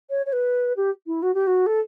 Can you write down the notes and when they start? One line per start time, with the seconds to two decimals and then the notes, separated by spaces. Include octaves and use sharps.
0.10 C#5
0.26 C#5
0.32 B4
0.76 G4
1.07 E4
1.22 F#4
1.34 G4
1.47 F#4
1.66 A4